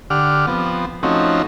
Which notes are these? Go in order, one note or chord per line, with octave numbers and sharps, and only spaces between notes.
D3 G4 F#5 D6 F6
F3 B3 C4
F3 A3 C4 C#4 D#4 F#4